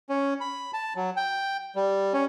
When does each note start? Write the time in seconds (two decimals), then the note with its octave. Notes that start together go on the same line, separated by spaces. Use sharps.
0.09 C#4
0.40 B5
0.74 A5
0.96 F#3
1.17 G5
1.76 G3
2.13 C#4